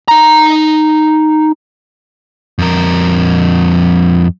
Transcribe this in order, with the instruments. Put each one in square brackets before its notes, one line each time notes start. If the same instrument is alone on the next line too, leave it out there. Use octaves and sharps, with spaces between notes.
[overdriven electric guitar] D#4 A#5
[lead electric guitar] F2 A#4